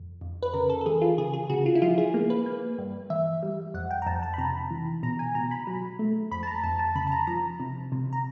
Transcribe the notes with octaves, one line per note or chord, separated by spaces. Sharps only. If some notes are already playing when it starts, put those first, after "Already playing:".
Already playing: F2
F2
B4
C#3 A#4
A4
A4
E3 G#4
F4
C#3 G#4
G#4
C#3 F#4
F4
E4
F3 F4
G#4
A#3
B4
A#3
G2
E3 E5
G3
F2 F#5
G5
A#5
F2 A5
A5
B5
C3 A#5
E3
B2 A#5
G#5
B2 A#5
B5
F#3
A3
F2 B5
A5
A#5
F2 A5
A5
C#3 B5
A5
A#5
F3 A#5
C3
C3
A#5